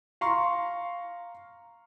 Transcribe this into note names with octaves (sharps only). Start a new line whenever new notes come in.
F5 A#5 C6 C#6